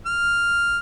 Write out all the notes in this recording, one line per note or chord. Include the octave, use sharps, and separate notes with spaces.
F6